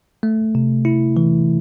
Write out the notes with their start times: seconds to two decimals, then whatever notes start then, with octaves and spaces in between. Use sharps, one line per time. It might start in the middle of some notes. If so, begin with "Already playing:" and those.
0.23 A3
0.55 C3
0.85 E4
1.17 E3